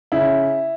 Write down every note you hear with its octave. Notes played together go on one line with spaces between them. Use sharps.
C#3 E4